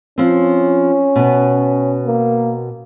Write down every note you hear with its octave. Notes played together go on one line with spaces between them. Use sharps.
F3 C4 C#4
B2 B3
A#3